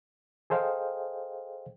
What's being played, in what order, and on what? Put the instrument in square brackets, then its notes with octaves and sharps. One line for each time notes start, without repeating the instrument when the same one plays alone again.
[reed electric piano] G#4 A4 C5 D#5 F5 G5